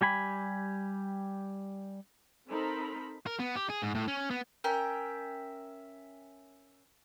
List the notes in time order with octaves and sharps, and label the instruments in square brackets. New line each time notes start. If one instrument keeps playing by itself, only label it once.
[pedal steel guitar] G3 G4 G#5 B5
[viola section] C4 D#4 A4 A#4 C5 B5
[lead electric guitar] A#4
B3
G4
G#4
G#2
A2
C#4
B3
[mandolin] C#4 A#4 E5 G5